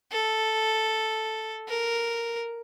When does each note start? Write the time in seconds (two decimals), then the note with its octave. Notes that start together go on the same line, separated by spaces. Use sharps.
0.12 A4
1.68 A#4